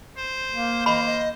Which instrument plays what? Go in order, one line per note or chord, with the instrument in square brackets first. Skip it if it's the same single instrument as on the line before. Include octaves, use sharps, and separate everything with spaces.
[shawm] C5
[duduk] A#3
[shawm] C5 [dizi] D#5 [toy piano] B5
[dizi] D#5